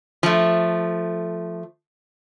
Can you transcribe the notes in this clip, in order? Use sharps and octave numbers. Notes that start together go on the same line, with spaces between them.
F3 A3